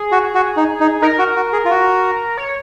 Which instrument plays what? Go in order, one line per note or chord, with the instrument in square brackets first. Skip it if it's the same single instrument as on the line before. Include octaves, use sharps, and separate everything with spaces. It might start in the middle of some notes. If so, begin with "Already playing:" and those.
Already playing: [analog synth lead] G#4
[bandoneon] F#4
F#4
D#4
D#4
[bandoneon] D#4 [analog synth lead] A#4
[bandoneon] F#4
F#4
G#4
F4
F#4
[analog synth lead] C#5